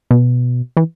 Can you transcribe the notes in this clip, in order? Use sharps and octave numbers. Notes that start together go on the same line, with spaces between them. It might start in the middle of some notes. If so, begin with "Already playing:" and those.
B2
E3